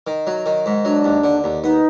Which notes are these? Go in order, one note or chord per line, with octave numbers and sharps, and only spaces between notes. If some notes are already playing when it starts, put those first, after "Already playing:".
D#3
F#3
D#3
G#2
F#3 D4
D#2
D3
D#2
B3 D#4